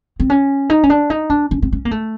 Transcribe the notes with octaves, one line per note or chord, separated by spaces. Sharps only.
C4
C#4
D#4
C#4
D4
D#4
D4
C#4
C4
C#4
A#3
A3